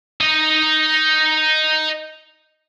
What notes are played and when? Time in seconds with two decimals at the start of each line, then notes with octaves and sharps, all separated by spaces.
0.21 D#4 D#5